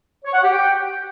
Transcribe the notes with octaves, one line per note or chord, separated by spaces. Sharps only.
C#5
F#5
G4
G5